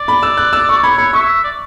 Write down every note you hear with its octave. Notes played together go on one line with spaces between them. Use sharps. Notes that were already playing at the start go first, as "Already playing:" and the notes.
Already playing: D5
B5
E6
F#6
E6
C#6
C#5 B5
C#5 B5
E5 C#6
D5